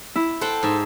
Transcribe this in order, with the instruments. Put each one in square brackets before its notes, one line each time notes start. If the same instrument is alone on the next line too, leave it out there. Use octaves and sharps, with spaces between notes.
[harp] E4
[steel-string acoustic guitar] A4 [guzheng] C5 F#5 G5
[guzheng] G#2 E5